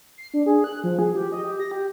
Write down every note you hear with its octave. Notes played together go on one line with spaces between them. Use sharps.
C7
D4
G#4
F#6
F3
G#4
G4
D#5
G4
A#6
G4